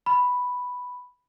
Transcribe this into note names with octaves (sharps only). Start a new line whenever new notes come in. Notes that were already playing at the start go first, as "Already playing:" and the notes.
B5